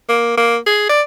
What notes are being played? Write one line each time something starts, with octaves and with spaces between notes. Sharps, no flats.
A#3
A#3
G#4
D5